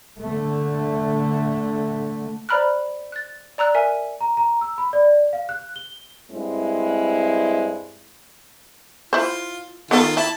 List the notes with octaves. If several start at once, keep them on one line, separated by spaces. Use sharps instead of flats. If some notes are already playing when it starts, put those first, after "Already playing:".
D3 A3
C5 D5 A#5 B5 F6 F#6
F#6 A6
D5 A#5 E6 F#6
A#4 E5 G#5
A#5
A#5
E6
B5
D5
F5
F#6
G7
G2 G#3 C4 E4
E4 F4 C5
D#3 B3 F4 A4
E4 A5 B5